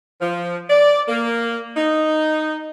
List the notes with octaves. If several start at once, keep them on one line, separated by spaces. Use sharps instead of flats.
F3
D5
A#3
D#4